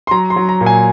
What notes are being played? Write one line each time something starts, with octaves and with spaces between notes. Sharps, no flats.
C6
F#3 A#5
C6
F#3
A#5
A#2
G#5